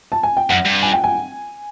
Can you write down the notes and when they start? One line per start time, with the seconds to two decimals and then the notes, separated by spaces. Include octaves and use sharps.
0.12 A5
0.23 G#5
0.37 G5
0.50 F#2 F#5
0.65 G2
0.82 G#5
0.93 G5
1.04 G#5